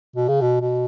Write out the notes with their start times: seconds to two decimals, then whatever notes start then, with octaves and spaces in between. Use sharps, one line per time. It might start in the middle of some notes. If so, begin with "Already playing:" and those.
0.16 B2
0.29 C#3
0.42 B2
0.61 B2